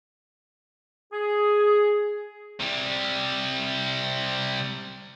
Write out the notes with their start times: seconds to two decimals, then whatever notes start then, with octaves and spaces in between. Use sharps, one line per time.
1.13 G#4
2.60 C3 G3